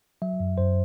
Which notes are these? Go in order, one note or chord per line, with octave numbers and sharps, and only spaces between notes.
F#3 E5
F#2
F#2 C5